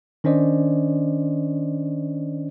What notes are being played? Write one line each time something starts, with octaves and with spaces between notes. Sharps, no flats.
D#3 C#4 D4 C5 D5 D#5